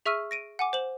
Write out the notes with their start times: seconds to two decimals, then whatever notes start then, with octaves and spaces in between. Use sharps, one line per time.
0.06 G#4 E5 C#6 E6 F6 D#7
0.31 A#6 D7 D#7
0.59 F#5 G#5 D6
0.73 C5 E7 F#7